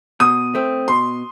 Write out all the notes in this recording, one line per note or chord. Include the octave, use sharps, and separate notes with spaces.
B2 D#6
A3 C4
B2 C6